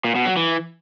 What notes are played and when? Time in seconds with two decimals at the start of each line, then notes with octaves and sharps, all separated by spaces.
0.04 A#2
0.15 B2
0.26 F#3
0.36 E3